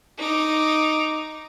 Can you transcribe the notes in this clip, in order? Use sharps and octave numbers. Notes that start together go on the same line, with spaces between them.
D#4 D6